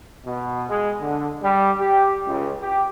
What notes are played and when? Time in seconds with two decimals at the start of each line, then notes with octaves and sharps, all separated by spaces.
0.25 B2
0.70 G#3
1.00 D3
1.42 G3
1.80 G4
2.27 C#2
2.61 G4